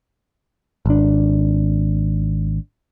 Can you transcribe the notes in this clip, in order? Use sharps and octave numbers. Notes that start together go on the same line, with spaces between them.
G#1 D4